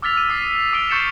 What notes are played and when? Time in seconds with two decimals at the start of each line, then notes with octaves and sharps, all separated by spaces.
0.02 D6 E6 F6 A6 B6 F7
0.17 D#7
0.29 D#6 B6 C7
0.53 F7
0.73 D#6 D7 F7 G7
0.90 C#6 G6 A6 C7 C#7 E7